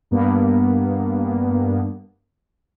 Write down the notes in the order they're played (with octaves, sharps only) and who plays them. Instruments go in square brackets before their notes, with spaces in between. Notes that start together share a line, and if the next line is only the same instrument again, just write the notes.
[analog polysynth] G2 A#3 B3